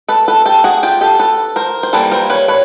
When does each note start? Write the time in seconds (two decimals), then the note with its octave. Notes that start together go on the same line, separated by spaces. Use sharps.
0.09 A4 B4
0.28 A4 B4
0.45 G4 A4
0.64 F#4 G#4
0.83 F4 G4
1.01 G4 A4
1.19 A4 B4
1.56 A#4 C5
1.83 C5
1.93 E3 G3 A#3 A4 B4
2.11 A#4 C5
2.30 B4 C#5
2.48 B4 C#5